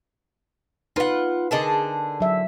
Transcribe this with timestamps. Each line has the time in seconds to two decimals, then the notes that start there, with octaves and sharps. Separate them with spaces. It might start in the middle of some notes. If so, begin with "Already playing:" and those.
0.96 D#4 F4 B4 F#5
1.51 D3 G#4 A#4 D#5 A5
2.20 F#3 E5